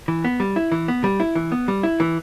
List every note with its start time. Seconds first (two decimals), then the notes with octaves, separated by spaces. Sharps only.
0.08 E3
0.24 B3
0.40 G3
0.56 E4
0.72 E3
0.88 B3
1.04 G3
1.20 E4
1.35 E3
1.52 B3
1.68 G3
1.83 E4
2.00 E3